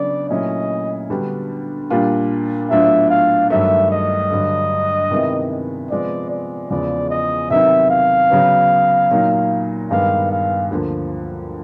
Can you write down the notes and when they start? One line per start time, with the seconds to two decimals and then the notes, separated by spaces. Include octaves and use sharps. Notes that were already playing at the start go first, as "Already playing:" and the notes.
Already playing: C#3 F#3 B3 D4 D5
0.29 A#2 F#3 A3 C#4 E4 D#5
1.10 D3 G3 B3 D4 F#4
1.90 A#2 G3 A#3 D4 F4
2.70 A2 F#3 B3 D4 F4 E5
3.10 F5
3.50 G2 D#3 F#3 A3 E5
3.91 D#5
4.30 G2 D3 F#3
5.11 C3 D#3 G#3 B3 E4
5.90 C3 F3 G#3 B3 D5
6.30 D5
6.70 E2 C#3 F3 G#3 D5
7.10 D#5
7.50 C3 D#3 F#3 B3 D#4 E5
7.90 F5
8.30 C#3 F#3 B3
9.11 A#2 F#3 A#3 D#4
9.91 G2 D#3 G#3 B3 F5
10.31 F5
10.71 D2 D3 F3 A#3